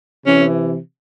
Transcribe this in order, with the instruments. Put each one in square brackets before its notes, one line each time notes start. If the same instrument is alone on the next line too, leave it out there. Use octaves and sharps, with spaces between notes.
[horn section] C3 E3 C#4